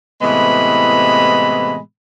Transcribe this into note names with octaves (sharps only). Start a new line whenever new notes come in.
A2 C3 E3 G#3 B3 B5